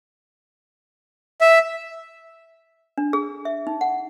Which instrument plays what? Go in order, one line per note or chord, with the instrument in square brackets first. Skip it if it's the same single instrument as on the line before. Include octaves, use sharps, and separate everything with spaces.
[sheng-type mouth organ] E5
[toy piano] D4
G#4
E5
D#4
F#5